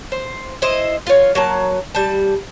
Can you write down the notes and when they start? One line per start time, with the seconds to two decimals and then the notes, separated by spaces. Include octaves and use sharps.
0.12 C5
0.62 E4 C5 D#5 E5
1.07 F4 C#5
1.35 F#3 A#3 A5
1.95 G3 A5